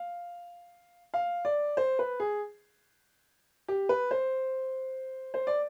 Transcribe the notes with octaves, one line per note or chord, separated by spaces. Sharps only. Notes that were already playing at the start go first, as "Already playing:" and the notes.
Already playing: F5
F5
D5
C5
B4
G#4
G4
B4
C5
C5
D5